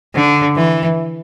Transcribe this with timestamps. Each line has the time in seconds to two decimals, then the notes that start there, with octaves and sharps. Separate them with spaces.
0.15 D3
0.56 E3